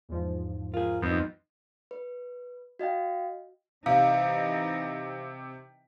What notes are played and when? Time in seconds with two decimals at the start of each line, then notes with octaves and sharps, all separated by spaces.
0.09 E2 G#2 F3
0.74 F4 G#4 A#4
1.02 F2 B3 D#4
1.91 B4
2.79 F#4 D#5 F5 G5
3.86 C3 E3 D#4 F5